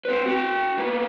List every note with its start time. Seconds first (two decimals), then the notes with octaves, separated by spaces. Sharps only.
0.05 C4 B4
0.26 F#4 G5
0.77 A#3 B3